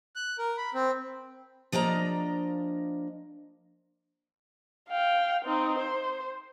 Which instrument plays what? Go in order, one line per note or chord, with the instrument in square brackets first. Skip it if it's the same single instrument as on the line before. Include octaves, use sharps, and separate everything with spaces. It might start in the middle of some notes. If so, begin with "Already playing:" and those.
[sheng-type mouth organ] F#6
A#4
B5
C4
[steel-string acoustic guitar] F3 A#3 D4 D#5 A#5
[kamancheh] F5 G5
C4 D#4
C5